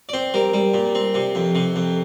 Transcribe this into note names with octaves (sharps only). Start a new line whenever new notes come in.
D5
C4 C5
G3 A#4
G3
A#2
C4
C3
F2
C3
F2